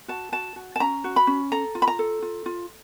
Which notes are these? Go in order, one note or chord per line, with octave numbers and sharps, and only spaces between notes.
F#4 A5
F#4 A5
F#4
A5
C#4 A#5
F#4
B5
C#4
A4 A#5
F4
B5
A#5
A4
F4
F4